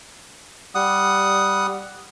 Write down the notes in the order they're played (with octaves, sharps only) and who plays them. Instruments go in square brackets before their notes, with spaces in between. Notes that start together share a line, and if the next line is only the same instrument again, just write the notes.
[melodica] G3 F#5 D#6